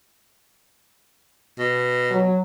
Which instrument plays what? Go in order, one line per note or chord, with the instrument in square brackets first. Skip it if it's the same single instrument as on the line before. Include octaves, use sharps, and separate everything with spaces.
[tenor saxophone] B2
[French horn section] F#3